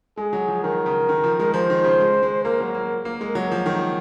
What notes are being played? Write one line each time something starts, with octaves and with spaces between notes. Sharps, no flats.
G#3 G#4
F#3
F3
D#3 A#4
C#3
D#3
F3
G#3
F3 C5
D#3
C#3
G#3
G#3
A#3 A#4
F#3
A#3
A#3
G#3
F#3
F3
D#3